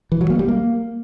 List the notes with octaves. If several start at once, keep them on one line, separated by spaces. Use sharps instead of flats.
E3
F#3
A#3
G3
A#3